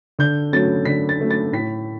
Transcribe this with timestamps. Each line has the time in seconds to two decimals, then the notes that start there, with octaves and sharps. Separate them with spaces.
0.19 D3 G6
0.52 F#3 A3 C#4 A6
0.85 D3 B6
1.09 A6
1.20 F#3 A3 C#4
1.31 A6
1.53 A2 B6